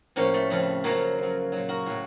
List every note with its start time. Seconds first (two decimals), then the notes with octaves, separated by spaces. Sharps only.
0.16 A2 F3 A#3 C#4
0.34 A3
0.50 F2 C#3 F3
0.84 F#2 C#3 F3 F#3 A#3
1.18 F3
1.23 F#2
1.52 A#2 F#3
1.69 F#4 A#4
1.86 A2 F#3